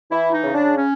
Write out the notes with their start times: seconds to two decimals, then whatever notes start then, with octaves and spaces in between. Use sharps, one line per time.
0.11 E3 E4
0.32 D#4
0.44 C#3
0.55 D4
0.77 C#4